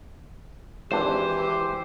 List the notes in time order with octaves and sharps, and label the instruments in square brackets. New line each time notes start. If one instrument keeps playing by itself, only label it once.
[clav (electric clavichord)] G#1 D4 [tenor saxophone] E3 [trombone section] G4 [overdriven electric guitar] C5